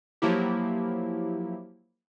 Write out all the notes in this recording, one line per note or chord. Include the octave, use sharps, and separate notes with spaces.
F3 F#3 A#3 E4 G4